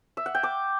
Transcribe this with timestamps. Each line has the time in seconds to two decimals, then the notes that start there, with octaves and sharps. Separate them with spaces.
0.17 E5
0.26 F#5
0.35 G5
0.43 D6